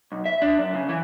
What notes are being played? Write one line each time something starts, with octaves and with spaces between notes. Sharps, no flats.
B1
E5
D4
F#2
C#3
E3